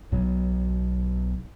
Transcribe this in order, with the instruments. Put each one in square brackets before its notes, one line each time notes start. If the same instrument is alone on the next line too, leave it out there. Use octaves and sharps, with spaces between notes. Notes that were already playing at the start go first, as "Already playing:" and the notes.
[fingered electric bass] B1 B2 F#3